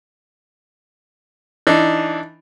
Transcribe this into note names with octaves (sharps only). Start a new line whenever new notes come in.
E3 D4 D#4